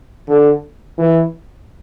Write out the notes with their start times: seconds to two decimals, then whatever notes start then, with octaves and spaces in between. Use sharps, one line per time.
0.28 D3
0.98 E3